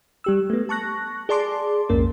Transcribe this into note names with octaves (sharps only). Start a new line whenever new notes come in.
G3 G4 E6
A3 B3
A5 C#6 F#6 A#6
G#4 D5 A5 C6 D6
B1 F2 G#2 A#3 C#4 A#4